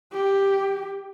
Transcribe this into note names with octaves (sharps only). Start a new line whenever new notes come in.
G4